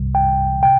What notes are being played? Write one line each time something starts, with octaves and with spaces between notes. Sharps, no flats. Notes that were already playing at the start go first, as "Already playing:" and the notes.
Already playing: C2 C3 G3
G5
C3 G5